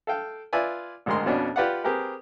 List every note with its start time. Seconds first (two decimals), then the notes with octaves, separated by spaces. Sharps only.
0.07 A4 F5 G5
0.53 F4 B4 D5 E5 G#5
1.06 G#1 D2 G#3 A#4 C6
1.26 F2 B2 B3 C#4 D4
1.56 F4 G4 B4 D5 F5 F#5
1.84 C4 G4 G#4 A#4 B4